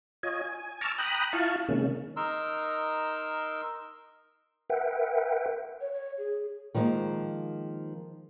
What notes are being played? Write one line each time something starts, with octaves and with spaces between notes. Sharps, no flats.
F4 C#5 D#5 G#5
G#5
A5 A#5 C#6 D6 E6 F6
G5 A#5 B5 D#6 F#6
E4 F4 F5 A5 C#6
C3 D#3 G#3 A#3 C#4
D#4 A#4 C6 E6
A#4 B4 E5 F#5 G5
C#5
C#5
G#4
D#3 F3 G#3 A#3